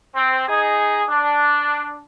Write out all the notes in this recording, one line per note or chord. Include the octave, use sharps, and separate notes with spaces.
C4
D#4 G#4
D4